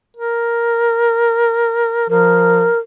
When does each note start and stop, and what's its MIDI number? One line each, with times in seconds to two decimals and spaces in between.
0.17 2.09 70
2.10 2.68 53
2.10 2.79 70